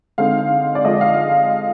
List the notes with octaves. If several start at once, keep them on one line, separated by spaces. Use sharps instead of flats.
D3 G#3 C4 D#4 F5
D5
D3 F3 G#3 D#5
F5